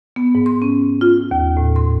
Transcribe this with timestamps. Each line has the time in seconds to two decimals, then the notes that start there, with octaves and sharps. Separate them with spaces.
0.16 B3
0.35 G#2
0.46 C6
0.62 C#4
1.01 F4
1.31 D#2
1.57 A2
1.76 C6